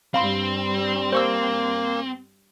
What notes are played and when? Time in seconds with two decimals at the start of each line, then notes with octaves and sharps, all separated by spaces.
0.14 G2 G3 C4 F5 B5 C6
1.12 A#3 C5 C#6 E6